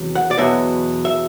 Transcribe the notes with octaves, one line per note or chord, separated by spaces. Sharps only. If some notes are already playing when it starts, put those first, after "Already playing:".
Already playing: E2 C3 F#3
F#5
D5
E2 B2 F#3 E5
E5